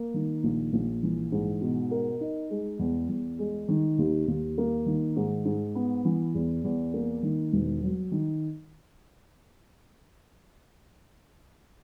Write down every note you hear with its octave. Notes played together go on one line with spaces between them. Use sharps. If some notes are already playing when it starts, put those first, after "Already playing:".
Already playing: A#3
D#3
A#1
A#1
E3
G#2
B2
A#4
D#4
G#3
E2
E2
G#3
D#3
D#2
D#2
A#3
D#3
G#2
G#2
B3
E3
E2
E2
A#3
D#3
E1
F#3
D#3